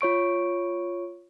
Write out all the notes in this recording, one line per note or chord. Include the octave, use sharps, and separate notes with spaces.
F4 C#5 C#6 D7